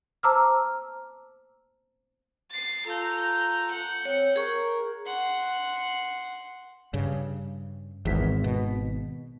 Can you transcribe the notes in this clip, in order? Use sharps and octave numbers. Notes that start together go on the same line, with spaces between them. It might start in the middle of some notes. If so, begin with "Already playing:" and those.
C5 A5 A#5 D6 E6 F6
A6 C7
F4 A4 A#5 G6
F#5 G6
C4 C#5
G#4 A#4 C#6
F#5 C6
G2 C#3
G#1 E2 B6
B2